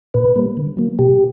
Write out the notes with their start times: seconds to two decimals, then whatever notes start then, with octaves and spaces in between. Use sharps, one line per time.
0.14 A#2 B4
0.36 G3 A#3
0.57 D3
0.77 F#3 A#3
0.99 B2 G4